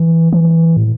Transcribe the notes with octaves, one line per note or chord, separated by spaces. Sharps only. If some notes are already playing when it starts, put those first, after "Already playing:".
Already playing: E3
E3
A2